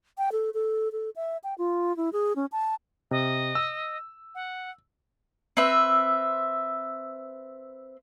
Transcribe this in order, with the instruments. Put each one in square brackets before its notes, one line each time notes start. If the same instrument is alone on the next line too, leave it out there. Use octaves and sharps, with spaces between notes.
[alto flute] G5
A4
A4
A4
E5
G5
F4
E4
G#4
C#4
A5
[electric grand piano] C3 [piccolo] D#5
[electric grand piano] E6
[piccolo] F#5
[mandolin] C4 B4 E5